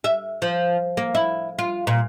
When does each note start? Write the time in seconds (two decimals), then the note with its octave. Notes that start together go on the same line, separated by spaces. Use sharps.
0.04 E5
0.42 F3
0.97 A#3
1.15 E4
1.59 F4
1.87 A#2